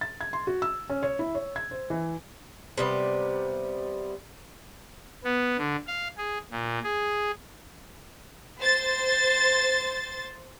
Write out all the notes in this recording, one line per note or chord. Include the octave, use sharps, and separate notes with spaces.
A6
G#6
C6
F#4
E6
C#4
C#5
E4
C#5
G#6
C5
E3
C3 G3 B3
B3
D3
F5
G#4
A#2
G#4
C5 A6